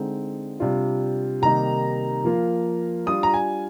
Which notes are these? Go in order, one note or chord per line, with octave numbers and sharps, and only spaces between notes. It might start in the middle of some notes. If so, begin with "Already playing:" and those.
Already playing: D3 G#3 C4 D#4
C3 G3 D4 F4
C3 D#3 G3 A#3 D#4 A#5
F3 A#3 F4
G3 D4 F4 D#6
A#5
G#5